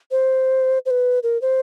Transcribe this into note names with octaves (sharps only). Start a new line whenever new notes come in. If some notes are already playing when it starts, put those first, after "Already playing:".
C5
C5
B4
A#4
C5